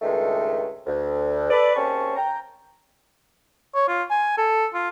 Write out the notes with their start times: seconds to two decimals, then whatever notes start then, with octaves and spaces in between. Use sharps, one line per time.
0.02 C#2 G2 D#3 G#3 A3
0.86 D2
1.50 A4 B4 D5
1.75 D#2 C#3 C4 C#4 A5 C#6
2.16 G5 A#5
3.75 C#5
3.88 F4
4.10 G#5
4.38 A4
4.74 F4